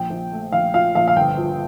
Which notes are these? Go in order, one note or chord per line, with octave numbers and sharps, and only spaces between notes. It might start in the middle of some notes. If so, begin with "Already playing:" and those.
Already playing: A#1 G5
A#1
A3
A#1 F5
A#2 F5
A#1 F5
F5
G1 G5
F3